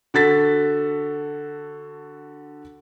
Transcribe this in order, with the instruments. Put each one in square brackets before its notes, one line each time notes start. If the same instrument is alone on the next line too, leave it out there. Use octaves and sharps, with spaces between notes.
[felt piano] D3 F#4 A4 A6 B6